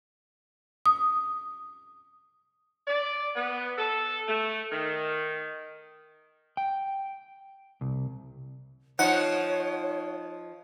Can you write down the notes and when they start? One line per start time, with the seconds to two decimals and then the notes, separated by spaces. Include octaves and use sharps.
0.86 D#6
2.87 D5
3.35 B3
3.78 A4
4.27 A3
4.72 D#3
6.57 G5
7.81 C2
8.99 F3 D#4 C#5 F#5